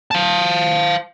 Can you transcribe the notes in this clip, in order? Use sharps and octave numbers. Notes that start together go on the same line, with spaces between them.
F5 A5